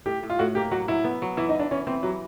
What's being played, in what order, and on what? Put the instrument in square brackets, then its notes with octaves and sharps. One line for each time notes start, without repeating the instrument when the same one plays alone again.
[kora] A2 [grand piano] G4
[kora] A2
[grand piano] F4
[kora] A2 [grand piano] F#4
[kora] A#3 [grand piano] G4
[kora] F#3 [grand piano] F#4
[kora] F#3 [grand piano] E4
[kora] B3
F#3
[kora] E3 [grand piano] E4
[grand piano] D#4
[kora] E3 [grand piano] D4
[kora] E3 [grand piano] C#4
[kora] E3 [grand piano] C4
[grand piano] F#3 [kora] G3